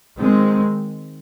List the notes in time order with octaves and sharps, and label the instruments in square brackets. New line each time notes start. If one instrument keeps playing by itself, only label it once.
[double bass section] D#3 G#3 C4